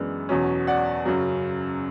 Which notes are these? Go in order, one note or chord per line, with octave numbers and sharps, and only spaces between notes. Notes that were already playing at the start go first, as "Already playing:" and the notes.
Already playing: F#2 E3 G#3 B3 D4
E2 B2 F#3 C#4
D5 F#5
F#2 C#3 F#3